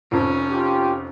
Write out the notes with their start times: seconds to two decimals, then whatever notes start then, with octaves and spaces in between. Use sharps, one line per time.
0.12 F1 F2 C#4
0.50 F4 G4